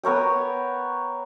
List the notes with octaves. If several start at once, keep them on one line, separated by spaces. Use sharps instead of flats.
B3 A#4 C#5 G5